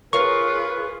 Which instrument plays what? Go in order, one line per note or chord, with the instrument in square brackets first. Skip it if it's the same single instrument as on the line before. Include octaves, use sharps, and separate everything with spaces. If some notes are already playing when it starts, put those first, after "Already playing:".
[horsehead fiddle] F4 G#4 [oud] A#4 C#5 F5 [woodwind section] B4 [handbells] C#6